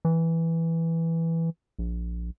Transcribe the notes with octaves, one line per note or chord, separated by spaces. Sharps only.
E3
A#1